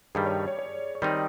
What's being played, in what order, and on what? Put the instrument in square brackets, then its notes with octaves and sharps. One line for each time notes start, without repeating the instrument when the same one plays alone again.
[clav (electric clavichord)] G2 D#3 G3 [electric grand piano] G#4
[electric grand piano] C#5
D5
C#5
C#5
C#5
[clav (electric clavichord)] D#3 G3 C4 D#4 [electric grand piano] D5